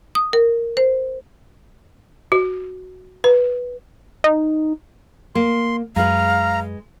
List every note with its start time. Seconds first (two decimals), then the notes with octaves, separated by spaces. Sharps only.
0.15 D#6
0.33 A#4
0.77 C5
2.32 F#4
3.24 B4
4.24 D#4
5.35 A#3 C6
5.96 F#2 G#3 B4 F5 A#5